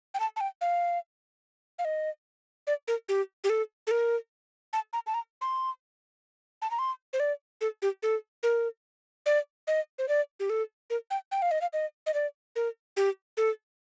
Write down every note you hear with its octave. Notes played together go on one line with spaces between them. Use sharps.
G5
A5
A5
G5
F5
F5
D#5
D5
A#4
G4
G4
A4
A4
A#4
A5
A#5
A5
A#5
C6
A5
A#5
C6
C5
D5
A4
G4
A4
A#4
D5
D#5
C5
D5
G4
A4
A#4
G5
G5
F5
D#5
F5
D#5
D#5
D5
A#4
G4
A4